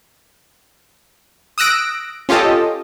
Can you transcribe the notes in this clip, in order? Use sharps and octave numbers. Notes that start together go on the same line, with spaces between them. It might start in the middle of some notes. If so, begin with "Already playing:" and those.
D#6 E6 F#6 A#6 D7
C#4 F4 G4 A4 D#5